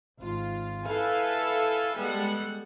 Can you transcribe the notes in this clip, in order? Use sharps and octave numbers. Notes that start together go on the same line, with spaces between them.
G#1 F4
E4 A4 B4 F5 G#5
G3 G#3 B3 A4 F#5